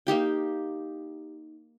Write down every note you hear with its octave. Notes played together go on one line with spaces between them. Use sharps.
A#3 D#4 G4 G5